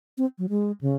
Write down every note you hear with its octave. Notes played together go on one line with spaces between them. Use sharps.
C4
F#3
G#3
C#3